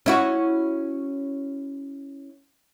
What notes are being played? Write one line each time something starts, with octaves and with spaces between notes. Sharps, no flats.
C#4 E4 F#4